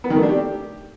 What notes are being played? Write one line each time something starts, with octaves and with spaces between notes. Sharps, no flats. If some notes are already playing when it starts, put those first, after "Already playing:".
B3
D#3
A3
D4
G4